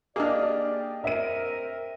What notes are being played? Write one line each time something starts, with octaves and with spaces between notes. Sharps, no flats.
A#3 D4 G4 G#4 D5 D#5 F6
C4 A#4 E5 D#7